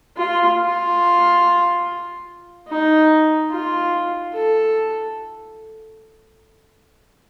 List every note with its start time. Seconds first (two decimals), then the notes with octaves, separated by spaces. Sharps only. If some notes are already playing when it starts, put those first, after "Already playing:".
0.16 F4
0.58 F4
2.68 D#4
3.50 F4
4.34 A4